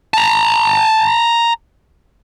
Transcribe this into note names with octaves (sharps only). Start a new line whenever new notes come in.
A5 A#5